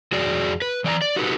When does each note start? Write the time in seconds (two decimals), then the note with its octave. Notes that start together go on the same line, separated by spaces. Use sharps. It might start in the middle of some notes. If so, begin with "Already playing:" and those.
0.12 F2 F#4 G#4 D5
0.62 B4
0.84 E3 D5 G5 A#5
1.02 D5
1.16 D#4 F#4 G4 A4 B4